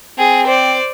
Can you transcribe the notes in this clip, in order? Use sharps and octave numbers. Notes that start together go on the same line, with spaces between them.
C4 G#4
C5 D5